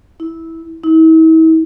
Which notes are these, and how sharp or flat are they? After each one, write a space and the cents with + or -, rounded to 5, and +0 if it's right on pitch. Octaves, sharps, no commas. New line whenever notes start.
E4 -15
E4 -40